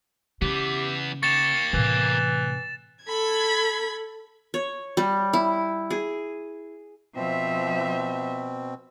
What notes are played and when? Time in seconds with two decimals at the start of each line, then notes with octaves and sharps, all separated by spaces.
0.42 C#3 E3 B3 G4
1.23 A#3 G4 C#6 A6 E7
1.73 A2 C3 E3
3.05 A4 B5 G#6
4.54 C#5
4.97 G3
5.33 E4
5.90 G#4
7.16 B2 F3 C4 E5